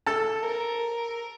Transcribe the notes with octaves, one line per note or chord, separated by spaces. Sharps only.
A4 A5
A#4